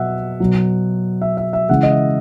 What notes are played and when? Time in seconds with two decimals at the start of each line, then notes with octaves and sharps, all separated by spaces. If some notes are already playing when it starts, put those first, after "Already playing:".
Already playing: B2 F#3 E5 F#5
0.40 B2 F#3
1.22 E5
1.37 E5
1.53 E5
1.69 C#3 E3 G#3 F#5
1.83 D#5
1.91 E5